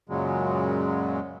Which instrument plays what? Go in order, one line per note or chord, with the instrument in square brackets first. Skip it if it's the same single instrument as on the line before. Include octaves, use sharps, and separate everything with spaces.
[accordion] F#2 A#2 C#3 F#3 G#3